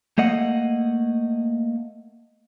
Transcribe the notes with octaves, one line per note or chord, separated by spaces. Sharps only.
A3 A#3 D#5 F#5